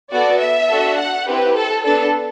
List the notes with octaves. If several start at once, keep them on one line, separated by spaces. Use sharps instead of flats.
B3 F#4 A4 D5
E5
D4 F#4 A4
F#5
C4 E4 G4 B4
A4
B3 D4 A4